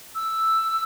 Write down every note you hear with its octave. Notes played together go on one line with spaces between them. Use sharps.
E6